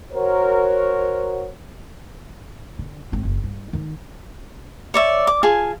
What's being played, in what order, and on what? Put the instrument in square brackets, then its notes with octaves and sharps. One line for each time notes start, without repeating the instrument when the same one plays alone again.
[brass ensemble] F#4 A#4 C5 C#5
[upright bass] D3
G#1 C4
F#1
G2
D#3 D#4
[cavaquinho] C#5 D5 E5
D6
F4 G#4 G#5 A5